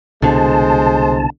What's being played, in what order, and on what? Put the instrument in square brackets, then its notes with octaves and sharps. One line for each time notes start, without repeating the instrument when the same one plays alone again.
[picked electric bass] C2 B2 D3 [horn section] G#3 C5 [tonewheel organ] A5